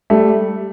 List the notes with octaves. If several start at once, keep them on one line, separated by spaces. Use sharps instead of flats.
G3 A3